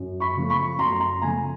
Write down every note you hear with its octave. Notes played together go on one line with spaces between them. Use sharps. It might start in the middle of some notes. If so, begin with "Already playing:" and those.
Already playing: F#2
B5 C#6
C#3 F3 A3
B5 C#6
F#2 A#5 C6
A#5 C6
C#3 F3 A3 G#5 A#5